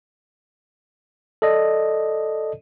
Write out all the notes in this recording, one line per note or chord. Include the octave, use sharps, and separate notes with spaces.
A4 D5 D#5